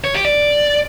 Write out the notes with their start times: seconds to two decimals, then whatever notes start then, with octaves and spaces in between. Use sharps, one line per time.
0.04 C#5
0.14 G4
0.25 D5